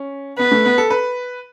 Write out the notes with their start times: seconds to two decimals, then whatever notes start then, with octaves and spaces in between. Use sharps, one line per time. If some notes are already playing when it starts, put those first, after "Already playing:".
Already playing: C#4
0.38 B3 B4
0.52 A3
0.65 B3
0.78 A4
0.90 B4